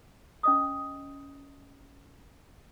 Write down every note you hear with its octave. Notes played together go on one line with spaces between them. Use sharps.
C#4 D#5 D#6